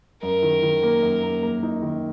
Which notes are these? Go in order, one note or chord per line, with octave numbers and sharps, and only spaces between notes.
F#2 A#4
D#3
D#3
A#3
F#2
A#3
A#3
D#4
D#3